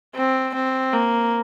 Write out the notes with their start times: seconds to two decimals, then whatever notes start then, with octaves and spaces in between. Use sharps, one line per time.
0.15 C4
0.54 C4
0.93 A#3